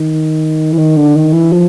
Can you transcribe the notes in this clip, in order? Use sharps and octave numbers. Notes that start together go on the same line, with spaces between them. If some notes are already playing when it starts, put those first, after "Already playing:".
Already playing: D#3
E3
D#3
D3
D#3
E3
F3